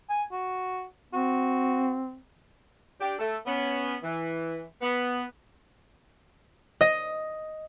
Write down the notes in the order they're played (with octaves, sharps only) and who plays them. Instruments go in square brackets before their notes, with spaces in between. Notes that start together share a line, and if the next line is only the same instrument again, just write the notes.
[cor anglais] G#5
F#4
[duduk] C4 [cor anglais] F#4
[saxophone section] D4 G4
A3 A4
B3 C#4
E3
B3
[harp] D#5